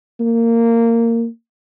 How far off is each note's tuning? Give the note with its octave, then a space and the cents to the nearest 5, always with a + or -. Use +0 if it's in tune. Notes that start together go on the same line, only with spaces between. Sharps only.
A#3 -15